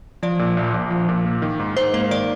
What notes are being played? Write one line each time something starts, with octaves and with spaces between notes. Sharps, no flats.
F3 D5
A#2
A#1
A#1
F3
A#2
A#3
D#3
G#2
G#2 C5
A#3 C5
D#3 D5